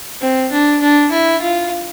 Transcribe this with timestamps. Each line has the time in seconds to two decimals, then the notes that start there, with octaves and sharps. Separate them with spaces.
0.22 C4
0.52 D4
0.82 D4
1.12 E4
1.42 F4